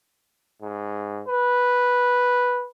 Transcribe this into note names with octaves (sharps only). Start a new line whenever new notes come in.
G#2
B4